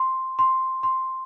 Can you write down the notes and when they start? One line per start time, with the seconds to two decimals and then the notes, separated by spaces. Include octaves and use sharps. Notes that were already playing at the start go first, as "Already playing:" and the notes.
Already playing: C6
0.39 C6
0.83 C6